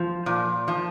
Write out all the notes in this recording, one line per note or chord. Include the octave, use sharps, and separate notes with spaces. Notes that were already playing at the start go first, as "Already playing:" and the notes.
Already playing: F3
A#2
F3